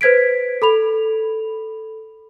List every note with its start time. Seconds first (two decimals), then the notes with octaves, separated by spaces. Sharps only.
0.01 B4 C5 G#6 B6 D7
0.62 A4 B5 F7